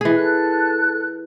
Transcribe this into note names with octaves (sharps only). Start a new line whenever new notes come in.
E3 G#4
A4 F#6